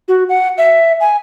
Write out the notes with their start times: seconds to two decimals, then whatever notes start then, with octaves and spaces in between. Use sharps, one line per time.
0.08 F#4
0.29 F#5
0.58 E5
1.00 G#5